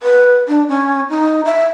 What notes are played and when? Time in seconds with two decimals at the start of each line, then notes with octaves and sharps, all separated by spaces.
0.03 B4
0.48 D4
0.69 C#4
1.10 D#4
1.45 E5